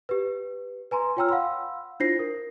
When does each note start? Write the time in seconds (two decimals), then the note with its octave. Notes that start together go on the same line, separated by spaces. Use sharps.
0.09 G4 B4
0.91 B4 G#5 A#5 C6
1.17 F4 C#5 G5 A#5 E6 F6
1.29 F5 F#5 B5 C6 E6
2.00 D4 E4 F4 C5 A#6 C7
2.19 A#4